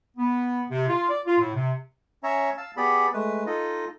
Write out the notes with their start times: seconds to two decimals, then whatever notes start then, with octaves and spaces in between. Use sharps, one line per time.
0.17 B3
0.69 C3
0.87 F4
1.09 D5
1.26 F4
1.39 A2
1.54 C3
2.23 C#4 C#5 E5 A#5
2.57 F5 A5 E6
2.77 B3 G4 G#4 D5 B5
3.13 G#3 A3 B4
3.46 D#4 F4 A4 D#5